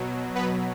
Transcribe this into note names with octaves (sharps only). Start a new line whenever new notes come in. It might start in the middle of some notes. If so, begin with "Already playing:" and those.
Already playing: B2 F#3
B3 B4